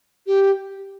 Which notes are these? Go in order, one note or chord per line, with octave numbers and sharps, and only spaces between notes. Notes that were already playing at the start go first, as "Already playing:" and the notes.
G4